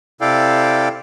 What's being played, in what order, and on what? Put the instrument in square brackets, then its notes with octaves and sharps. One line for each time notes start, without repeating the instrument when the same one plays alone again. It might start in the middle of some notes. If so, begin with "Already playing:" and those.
[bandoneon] C3 E4 A4 D5 F5 G5